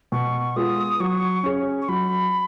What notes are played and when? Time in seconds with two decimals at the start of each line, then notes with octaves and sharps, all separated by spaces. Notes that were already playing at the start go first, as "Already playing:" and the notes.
0.12 B2 C#6
0.56 G#3 B3 F4 G#4 D#6
1.00 F#3 C#6
1.43 C#4 G#4 C#5
1.82 C#6
1.88 F#3 B5